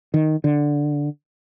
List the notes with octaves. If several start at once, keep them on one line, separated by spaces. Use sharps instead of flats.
D#3
D3